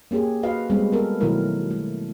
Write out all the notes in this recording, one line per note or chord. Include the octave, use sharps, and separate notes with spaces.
A#3 C#4 G4 G#4
F#4 B4 D#5 F5
G3 G#3 B3 C4
B3 A4 A#4
B2 D#3 F#3 A3 E4 A#4
A3